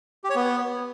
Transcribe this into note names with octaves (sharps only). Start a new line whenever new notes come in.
G4
C#5
B3